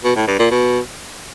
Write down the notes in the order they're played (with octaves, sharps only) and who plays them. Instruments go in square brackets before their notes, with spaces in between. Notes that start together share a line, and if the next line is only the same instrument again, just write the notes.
[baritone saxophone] B2
A2
G2
A#2
B2